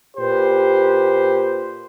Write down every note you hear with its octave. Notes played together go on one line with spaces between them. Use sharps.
A#2 G4 B4 C5